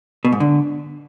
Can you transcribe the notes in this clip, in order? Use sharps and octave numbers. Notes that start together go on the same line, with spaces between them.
B2
G#2
D3